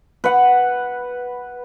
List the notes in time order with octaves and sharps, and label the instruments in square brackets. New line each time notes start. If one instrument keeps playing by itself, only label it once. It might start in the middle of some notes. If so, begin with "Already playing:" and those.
[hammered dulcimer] B4 F#5